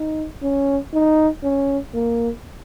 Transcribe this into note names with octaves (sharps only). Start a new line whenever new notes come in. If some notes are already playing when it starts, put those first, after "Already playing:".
Already playing: D#4
C#4
D#4
C#4
A#3